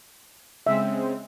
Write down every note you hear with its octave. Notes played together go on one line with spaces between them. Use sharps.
C#3 G#3 C4 E5